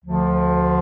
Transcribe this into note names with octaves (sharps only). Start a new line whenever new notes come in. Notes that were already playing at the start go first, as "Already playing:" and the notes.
D2 D3 F3